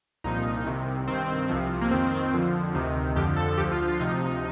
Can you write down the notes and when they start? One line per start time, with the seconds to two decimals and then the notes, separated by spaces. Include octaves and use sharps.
0.24 C2 A#2 F3 D#4
0.66 C2 C3 D#3
1.08 G2 D#3 C4
1.49 C2 C3 F3
1.81 A#3
1.91 F2 D#3 C4
2.33 F2 D3 F3
2.75 D2 C3 D#3
3.16 F2 D3 F3 G4
3.37 A4
3.58 D2 D3 F3 G4
3.72 F4
3.85 F4
3.99 D2 C3 F3 D#4